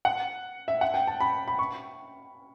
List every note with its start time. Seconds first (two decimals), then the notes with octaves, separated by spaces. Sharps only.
0.05 F#5
0.68 E5
0.81 F#5
0.94 G5
1.07 A5
1.20 B5
1.48 B5
1.59 C#6